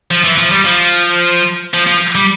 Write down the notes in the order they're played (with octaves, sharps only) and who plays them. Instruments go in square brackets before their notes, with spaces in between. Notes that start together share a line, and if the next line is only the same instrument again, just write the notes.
[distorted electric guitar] F3
E3
F3
G3
F3
F3
F3
G3